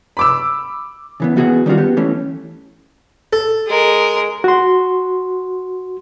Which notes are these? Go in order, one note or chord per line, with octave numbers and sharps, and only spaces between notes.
B5 D6 E6
C#3 E3 B3
E3 B3 F#4 G#4 F#5
D#3 G3 C#4 F4 F#4
B3 G4
E3 A3 C#4
A4
G#3 A#4
F#4 C6